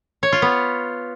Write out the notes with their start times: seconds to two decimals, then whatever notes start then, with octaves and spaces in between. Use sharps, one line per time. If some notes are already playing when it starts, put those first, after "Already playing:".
0.23 C#5
0.32 F4
0.42 B3